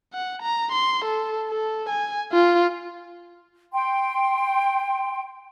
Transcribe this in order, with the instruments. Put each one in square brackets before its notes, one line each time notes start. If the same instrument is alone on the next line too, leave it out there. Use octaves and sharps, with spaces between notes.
[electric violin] F#5
A#5
C6
A4
A4
G#5
F4
[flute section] G5 C6